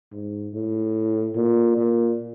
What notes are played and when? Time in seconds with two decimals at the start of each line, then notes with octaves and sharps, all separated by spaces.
0.12 G#2
0.54 A2
1.36 A#2
1.77 A#2